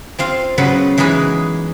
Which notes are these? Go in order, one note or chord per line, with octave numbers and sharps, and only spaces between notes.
C4 F4 F5
C#3 F#3 B3 B4 F#5
E3 G#3 D#4 G#4 B4